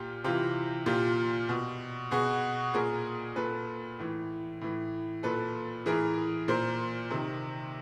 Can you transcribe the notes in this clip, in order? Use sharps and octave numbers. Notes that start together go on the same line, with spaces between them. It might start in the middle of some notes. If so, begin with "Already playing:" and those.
Already playing: A#2 F4 G4
C3 E3 F4 G4
A#2 F4 G4
B2
B2 F#4 G#4
A#2 G#4 A#4
A#2 A4 B4
A2 E3
A2 E3
A#2 A4 B4
A2 E3 G#4 A#4
A#2 A#4 C5
C3 D#3